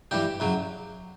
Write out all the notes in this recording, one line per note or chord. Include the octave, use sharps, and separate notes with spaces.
G2 E3 G3 G4
F#2 C#3 F#3